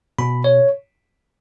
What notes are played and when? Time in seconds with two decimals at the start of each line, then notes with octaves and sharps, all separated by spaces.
0.19 B2 B5
0.44 C#5